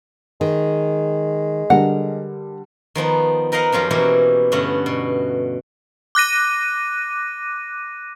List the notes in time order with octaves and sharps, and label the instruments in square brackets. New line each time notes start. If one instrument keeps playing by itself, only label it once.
[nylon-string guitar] D#3 [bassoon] G#3
[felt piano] D3 G3 [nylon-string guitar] A#4 [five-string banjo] F#5
[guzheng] D#3 F3 B3 D#4
D#4 A#4 B4 D#5 F5 F#5
F#2 F3 C#4 F4 G4
B2 E3 A#3 E4 F#4 G4
G2 D3 A3 B3 C#4 F#4
B2
[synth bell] D6 F#6 A#6 D#7